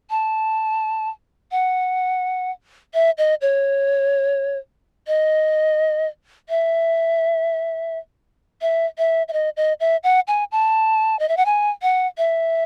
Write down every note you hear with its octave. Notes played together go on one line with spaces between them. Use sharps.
A5
F#5
E5
D#5
C#5
D#5
E5
E5
E5
E5
D#5
D#5
E5
F#5
G#5
A5
D#5
E5
F#5
G#5
F#5
E5